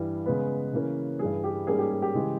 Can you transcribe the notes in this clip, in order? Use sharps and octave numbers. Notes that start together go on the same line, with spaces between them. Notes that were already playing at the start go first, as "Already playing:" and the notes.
Already playing: G2 E3 G3
C#3 G#3 B3 B4
C#3 E3 A#3 C#4
G2 E3 G3 G#4
G4
G#2 G3 A#3 C#4 G#4
G4
G#4
G4
C#3 E3 G#3